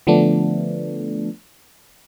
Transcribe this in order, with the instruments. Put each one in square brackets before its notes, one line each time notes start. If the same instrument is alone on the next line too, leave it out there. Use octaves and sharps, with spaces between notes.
[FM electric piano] D3 F3 A3 B3 D4